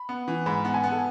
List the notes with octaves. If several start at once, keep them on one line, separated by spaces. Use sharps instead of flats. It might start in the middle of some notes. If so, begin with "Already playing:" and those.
Already playing: B5
B3
E3
G#2 B5
B3
G#5
B3
A4